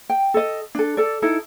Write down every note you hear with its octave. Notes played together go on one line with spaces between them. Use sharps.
G5
A4 D#5
D4 A4
A4 D5
D#4 E4 A4